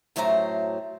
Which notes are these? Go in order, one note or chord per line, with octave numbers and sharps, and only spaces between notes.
F#2 A2 F#3 A3 C5 A#5